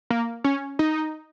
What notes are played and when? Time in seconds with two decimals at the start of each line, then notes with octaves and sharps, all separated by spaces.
0.10 A#3
0.44 C#4
0.79 D#4